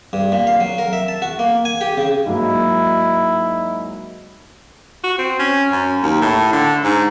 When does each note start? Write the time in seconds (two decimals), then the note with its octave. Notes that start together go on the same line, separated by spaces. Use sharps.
0.13 G2
0.32 A#2
0.47 F5
0.60 F#3
0.78 A#4
0.93 E5
1.08 A5
1.22 F#4
1.39 A#3
1.65 G#5
1.81 G4
1.98 C#3
2.26 G#2 F#3 A#3 E4
5.04 F#4
5.18 C4
5.39 C#4
5.72 F#2
6.03 D#2
6.21 A2
6.53 D3
6.84 G#2